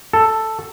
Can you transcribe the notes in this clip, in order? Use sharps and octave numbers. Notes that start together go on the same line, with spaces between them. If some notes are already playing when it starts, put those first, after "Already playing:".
A4